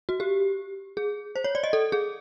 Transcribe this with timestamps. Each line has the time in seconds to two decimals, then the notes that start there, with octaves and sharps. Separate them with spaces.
0.09 F#4
0.20 G4
0.97 G#4
1.36 C5
1.44 C#5
1.55 D5
1.64 D#5
1.73 A4
1.92 G#4